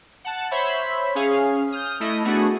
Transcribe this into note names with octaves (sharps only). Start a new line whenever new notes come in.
F#5 A5 F#6
C5 C#5 E5 B5
C#4 G#4 F5
D#6 F6 G6
A3 E4 D#5
A3 B3 D4 F#4 G#4